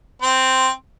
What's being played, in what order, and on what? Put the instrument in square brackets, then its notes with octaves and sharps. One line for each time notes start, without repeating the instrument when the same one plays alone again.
[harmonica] C4